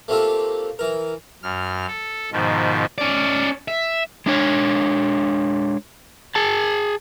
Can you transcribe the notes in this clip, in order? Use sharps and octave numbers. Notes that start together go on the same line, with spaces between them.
A3 A#3 C4 F4 G4 A4
E3 A#4
F#2 F6
A4
G#2 B2 D#3 F3
C#4 D5
E5
G#3 D4 C#5
G#4 A5